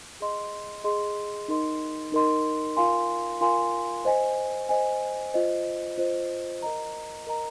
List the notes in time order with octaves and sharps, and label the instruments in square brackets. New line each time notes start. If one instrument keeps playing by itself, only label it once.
[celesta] G#4 D#5 C6
G#4 D#5 C6
D#4 A#4 D#5 C6
D#4 A#4 D#5 C6
F4 A#4 F5 G#5 C6
F4 A#4 F5 G#5 C6
C5 D#5 G#5
C5 D#5 G#5
F4 C5 D#5
F4 C5 D#5
A#4 D#5 A#5
A#4 D#5 A#5